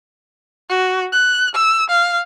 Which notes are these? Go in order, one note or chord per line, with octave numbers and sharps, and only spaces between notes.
F#4
F#6
E6
F5